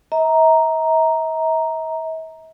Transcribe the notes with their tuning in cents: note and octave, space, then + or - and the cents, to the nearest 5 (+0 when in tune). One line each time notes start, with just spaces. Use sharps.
E5 -45 A#5 +0